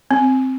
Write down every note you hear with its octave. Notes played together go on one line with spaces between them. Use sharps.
C4